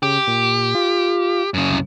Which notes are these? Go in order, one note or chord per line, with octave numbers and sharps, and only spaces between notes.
C#3 G4
A#2
F4
F#2 C#3
C2